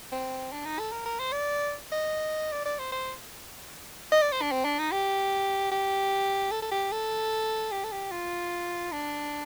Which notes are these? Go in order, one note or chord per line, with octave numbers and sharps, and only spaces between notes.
C4
D4
D#4
A4
A#4
A#4
C5
D5
D#5
D5
D5
C5
C5
D#5
D5
C5
D4
C4
D4
D#4
G4
G4
A4
A4
G4
A4
G4
A4
G4
F4
D4